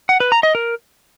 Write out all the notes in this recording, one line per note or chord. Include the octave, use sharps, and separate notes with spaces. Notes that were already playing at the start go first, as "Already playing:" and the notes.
F#5
B4
A#5
D#5
A#4